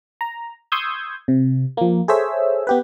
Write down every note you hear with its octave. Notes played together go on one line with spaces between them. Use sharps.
A#5
C6 C#6 D#6 E6 G6 G#6
C3
F3 A#3
G#4 A4 C5 C#5 E5 E6
B3 G4 B4